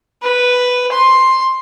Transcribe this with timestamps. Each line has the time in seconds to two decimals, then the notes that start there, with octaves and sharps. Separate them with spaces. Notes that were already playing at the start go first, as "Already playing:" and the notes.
0.22 B4
0.92 C6